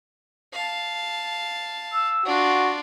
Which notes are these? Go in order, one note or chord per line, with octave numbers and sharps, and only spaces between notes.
F5 A5
E6
D4 F4 F#4